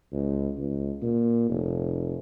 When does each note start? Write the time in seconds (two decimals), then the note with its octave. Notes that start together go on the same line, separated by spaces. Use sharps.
0.13 C#2
0.58 C#2
1.02 A#2
1.50 F1